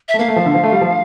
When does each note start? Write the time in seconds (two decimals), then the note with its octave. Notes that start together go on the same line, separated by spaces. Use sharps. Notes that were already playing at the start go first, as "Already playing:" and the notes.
0.08 E5
0.14 A3
0.19 A#3 F5
0.28 A3
0.36 F3
0.46 D3
0.54 F3
0.64 A3
0.72 G3
0.81 F3